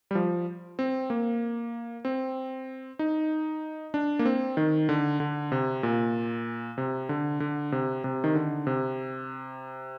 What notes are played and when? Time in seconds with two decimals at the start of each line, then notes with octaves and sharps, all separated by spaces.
0.11 G3
0.15 F3
0.79 C4
1.10 A#3
2.05 C4
2.99 D#4
3.94 D4
4.19 A#3
4.25 C4
4.57 D#3
4.89 D3
5.20 D3
5.52 C3
5.83 A#2
6.78 C3
7.09 D3
7.40 D3
7.72 C3
8.04 C3
8.24 D#3
8.35 D3
8.67 C3